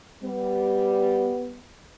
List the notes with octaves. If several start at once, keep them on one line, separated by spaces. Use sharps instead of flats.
G3 B3